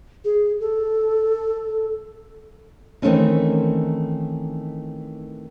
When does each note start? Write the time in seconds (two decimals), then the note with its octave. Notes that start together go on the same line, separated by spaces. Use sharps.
0.25 G#4
0.60 A4
3.02 D#3 E3 A3 C4 C#4 D#4